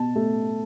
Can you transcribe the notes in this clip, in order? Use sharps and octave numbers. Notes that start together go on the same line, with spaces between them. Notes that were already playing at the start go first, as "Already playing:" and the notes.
Already playing: B2 A5
A3